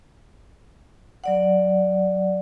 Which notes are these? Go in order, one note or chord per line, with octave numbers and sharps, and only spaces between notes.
F#3 D5 F#5